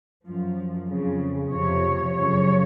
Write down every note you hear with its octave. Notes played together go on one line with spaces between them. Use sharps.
F#2 F3
F2 C#3 F3
F2 C3 F3 C#5
F#2 C#3 F3 C#5